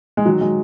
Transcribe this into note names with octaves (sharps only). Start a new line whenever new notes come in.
G#3
D#3 F#3
G#3